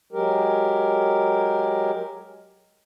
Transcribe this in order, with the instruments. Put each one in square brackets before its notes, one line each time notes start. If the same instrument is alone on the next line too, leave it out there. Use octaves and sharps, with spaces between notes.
[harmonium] F#3 G#3 G4 A#4